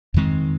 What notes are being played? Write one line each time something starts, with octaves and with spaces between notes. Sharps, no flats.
F2 D#3 G#3 C4